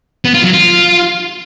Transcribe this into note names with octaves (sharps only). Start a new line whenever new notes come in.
B3
F4
F#3
F4